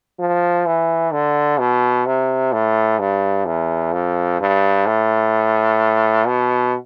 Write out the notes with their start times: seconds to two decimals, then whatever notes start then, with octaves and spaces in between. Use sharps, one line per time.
0.19 F3
0.66 E3
1.13 D3
1.59 B2
2.06 C3
2.53 A2
2.99 G2
3.46 E2
3.93 F2
4.40 G2
4.86 A2
6.26 B2